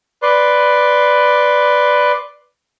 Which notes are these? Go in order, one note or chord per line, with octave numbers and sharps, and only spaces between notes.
B4 D5 C6